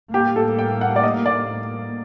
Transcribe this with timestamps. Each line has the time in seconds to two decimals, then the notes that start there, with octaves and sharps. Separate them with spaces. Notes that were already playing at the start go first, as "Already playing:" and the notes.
0.13 A2 G3 A#3 G4
0.36 A4
0.59 G5
0.81 F#5
0.96 D5
1.03 D#5
1.26 D5